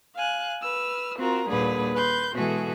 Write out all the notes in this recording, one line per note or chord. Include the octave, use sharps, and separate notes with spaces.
F5 G#5 F#6
B4 E6 F6
C4 F4 F#4 A#4
D#2 A#2 D3 G3 G#4 B4
B4 C6 G6
B2 E3 G#3 F#4 G#4 A4